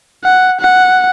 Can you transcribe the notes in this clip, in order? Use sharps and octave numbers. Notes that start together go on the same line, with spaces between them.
F#5
F#5